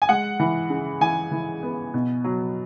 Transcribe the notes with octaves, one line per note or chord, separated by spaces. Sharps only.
G#5
G#3 F#5
E3
C#3
E3 G#5
E3
B3
B2
F#3